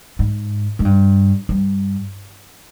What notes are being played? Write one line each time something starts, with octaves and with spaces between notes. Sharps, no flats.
G#2
G#2
G2
G2